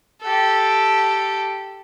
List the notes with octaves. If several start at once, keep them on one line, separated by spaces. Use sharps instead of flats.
G4 A4